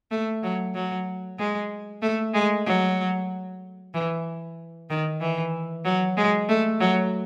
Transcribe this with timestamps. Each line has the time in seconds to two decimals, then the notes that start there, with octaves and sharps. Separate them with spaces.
0.11 A3
0.43 F#3
0.75 F#3
1.39 G#3
2.02 A3
2.34 G#3
2.66 F#3
3.94 E3
4.90 D#3
5.21 E3
5.85 F#3
6.17 G#3
6.49 A3
6.80 F#3